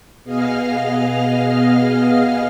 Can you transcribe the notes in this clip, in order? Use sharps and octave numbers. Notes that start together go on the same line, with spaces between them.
B2 B3 G#4 D#5 F5 F6